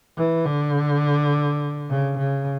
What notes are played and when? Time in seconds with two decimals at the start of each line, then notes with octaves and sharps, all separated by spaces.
0.17 E3
0.46 D3
1.90 C#3
2.18 C#3